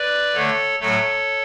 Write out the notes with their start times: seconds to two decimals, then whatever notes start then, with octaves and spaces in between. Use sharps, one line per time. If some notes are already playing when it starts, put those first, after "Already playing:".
Already playing: B4 D5
0.34 D3 A3 A4 C#5
0.80 A2 F#3 A3 A4 C#5